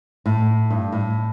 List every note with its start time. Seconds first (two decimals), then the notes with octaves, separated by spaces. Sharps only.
0.26 A2
0.70 G2
0.92 A2